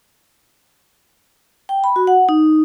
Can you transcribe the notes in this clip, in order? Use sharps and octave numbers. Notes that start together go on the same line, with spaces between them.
G5
B5
F#4
F#5
D#4